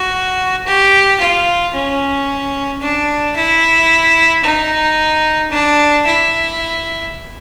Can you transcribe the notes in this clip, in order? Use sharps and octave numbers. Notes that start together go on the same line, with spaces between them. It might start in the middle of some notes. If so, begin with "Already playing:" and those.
Already playing: F#4
G4
F4
C#4
D4
E4
D#4
D4
E4